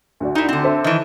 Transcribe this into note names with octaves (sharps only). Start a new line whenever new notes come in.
D2 F#4 D5
D#4 E4
D3 C4
A4 C5 E5
D#3 E3